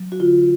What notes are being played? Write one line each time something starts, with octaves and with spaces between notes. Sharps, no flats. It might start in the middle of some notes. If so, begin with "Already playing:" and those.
Already playing: F#3
F#4
D3 F4